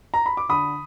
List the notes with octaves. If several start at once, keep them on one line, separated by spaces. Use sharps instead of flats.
A#5
B5
D6
D3 B5 D#6